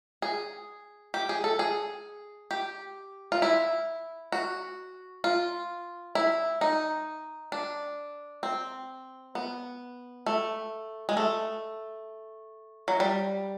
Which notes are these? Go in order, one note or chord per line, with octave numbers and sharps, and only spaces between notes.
G#4
G4
G#4
A4
G#4
G4
F4
E4
F#4
F4
E4
D#4
D4
C4
B3
A3
G#3
A3
F#3
G3